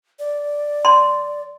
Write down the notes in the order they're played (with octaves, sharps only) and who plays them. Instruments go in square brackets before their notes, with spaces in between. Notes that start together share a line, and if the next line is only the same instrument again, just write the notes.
[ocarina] D5
[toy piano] C6